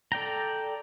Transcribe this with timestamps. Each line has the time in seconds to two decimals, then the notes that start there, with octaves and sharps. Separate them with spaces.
0.12 A4 D5 G5 A#5